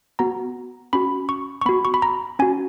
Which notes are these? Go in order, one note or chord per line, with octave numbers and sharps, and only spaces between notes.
B3 F#4 A#5
C#4 F#4 B5
C#6
C#6
B3 F#4 B5
C#6
B5
A#5
C#4 F#4 G#5